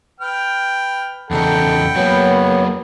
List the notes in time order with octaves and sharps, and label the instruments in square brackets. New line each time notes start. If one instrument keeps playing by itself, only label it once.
[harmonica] B4 G5 F6
[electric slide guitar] E2 C#3 D#4 [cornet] A4 [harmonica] F#5 G5 B5
[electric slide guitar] F#3 A#3 [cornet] B3 [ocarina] C#5